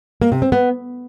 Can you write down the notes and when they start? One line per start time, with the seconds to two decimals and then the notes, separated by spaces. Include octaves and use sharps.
0.22 A#3
0.32 C3
0.42 C4
0.52 B3